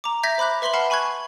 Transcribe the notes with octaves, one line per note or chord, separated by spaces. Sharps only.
A#5 D6
E5 G6 G#6 A#6 B6
C5 B5 D6 F#6 G6
B4 E5 C6 B6 F#7 G7
F#5 A5 B5 F6 C7 C#7
G#5 B5 C#6 F#6 G#6